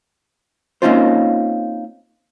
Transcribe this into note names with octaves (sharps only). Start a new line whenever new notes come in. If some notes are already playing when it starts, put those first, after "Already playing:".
A#3 C4 C#4 D#4 F4 C5